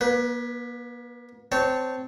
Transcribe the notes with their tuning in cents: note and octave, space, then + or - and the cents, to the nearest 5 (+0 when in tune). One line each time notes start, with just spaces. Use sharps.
A#3 +45 B4 +0
C4 -15 C#5 +0 A5 +0